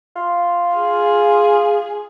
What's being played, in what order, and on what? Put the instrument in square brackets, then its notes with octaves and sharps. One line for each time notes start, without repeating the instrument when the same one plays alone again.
[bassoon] F4
[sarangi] G#4